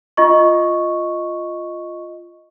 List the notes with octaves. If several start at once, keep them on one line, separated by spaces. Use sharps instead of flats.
F4 D#5 C#6